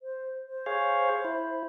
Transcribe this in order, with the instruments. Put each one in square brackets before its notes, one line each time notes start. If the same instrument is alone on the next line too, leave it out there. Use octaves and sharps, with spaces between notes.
[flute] C5
C5
[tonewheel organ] G#4 C#5 F5
E4